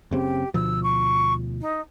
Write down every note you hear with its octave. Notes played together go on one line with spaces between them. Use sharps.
F#1 C#3 C4 G4
D2 B2 F3 E6
C#6
D#4